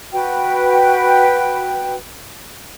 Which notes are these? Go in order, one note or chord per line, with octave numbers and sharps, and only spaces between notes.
F#4 B4 G5